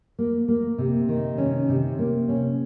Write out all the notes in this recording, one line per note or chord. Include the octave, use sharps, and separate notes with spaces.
A#3
A#3
C3
D#3
C#4
C3
A#3
C#4